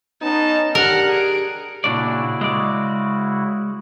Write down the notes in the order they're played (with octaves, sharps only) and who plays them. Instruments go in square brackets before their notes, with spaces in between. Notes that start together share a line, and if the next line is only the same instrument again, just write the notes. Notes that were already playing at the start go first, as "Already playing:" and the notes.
[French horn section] B3 C#4 D#4 [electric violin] A5
[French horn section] D4 G4 [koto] A#4 [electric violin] F#5 F6
[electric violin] G#4 D7
[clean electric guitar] A#2 D4 D5 [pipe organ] C#3 E4 F#4
[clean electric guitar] G#3 D5